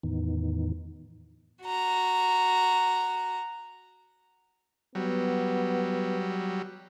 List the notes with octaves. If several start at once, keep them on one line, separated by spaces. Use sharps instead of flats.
E2 A2 D#3 E3 B3 D#4
F#4 A#5
F#3 G3 B3